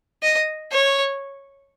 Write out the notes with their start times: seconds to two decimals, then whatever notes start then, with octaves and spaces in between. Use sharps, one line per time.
0.22 D#5
0.71 C#5